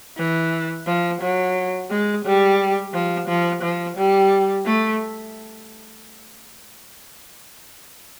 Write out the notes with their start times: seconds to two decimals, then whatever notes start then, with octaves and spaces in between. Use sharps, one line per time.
0.18 E3
0.87 F3
1.21 F#3
1.90 G#3
2.25 G3
2.93 F3
3.28 F3
3.62 F3
3.97 G3
4.66 A3